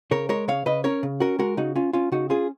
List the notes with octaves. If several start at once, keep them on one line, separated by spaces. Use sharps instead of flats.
C#3 A#4 C#5
G#3 A#4 C#5
C#3 C#5 F5
C#3 B4 D#5
C#4 A#4 C#5
C#3
C#4 F#4 A#4
G#3 F#4 A#4
C#3 D#4 F#4
C#4 F4
C#4 F4
C#3 D#4 F#4
C#4 F4 G#4